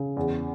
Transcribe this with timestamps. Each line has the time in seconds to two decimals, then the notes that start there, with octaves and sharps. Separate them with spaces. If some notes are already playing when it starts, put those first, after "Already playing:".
Already playing: C#3
0.17 E2